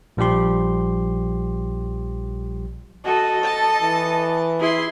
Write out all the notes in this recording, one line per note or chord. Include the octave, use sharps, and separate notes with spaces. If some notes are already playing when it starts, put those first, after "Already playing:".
A#1 F3 G3 G4 C6
F#4 A4 D#5
A5
E3
E4 G#4 C6